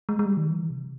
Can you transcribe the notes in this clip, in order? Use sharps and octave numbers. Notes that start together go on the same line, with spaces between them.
G#3
G#3
G3
D#3
E3
C3